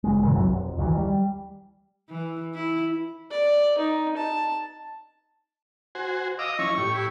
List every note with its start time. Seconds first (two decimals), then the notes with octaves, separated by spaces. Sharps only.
0.04 F#1 G#3
0.22 F#2 A#2 C#3 E3
0.34 B1 F#2 C3 F#3
0.50 F1
0.78 D2 D#3 E3
0.97 G3
2.09 E3
2.54 E4
3.30 D5
3.78 D#4
4.16 A5
5.95 F#4 C5 G#5
6.39 D#5 F5 D6 E6
6.59 F3 C#4 E4 C#6
6.78 A2 G4
6.93 E4